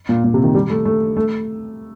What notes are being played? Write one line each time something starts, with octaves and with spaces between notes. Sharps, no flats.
A#2
A#2
C3
D#3
G3
A3
A3
A3